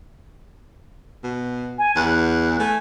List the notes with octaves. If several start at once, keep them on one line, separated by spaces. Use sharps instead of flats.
B2
G#5
E2 F#6
A3 G#5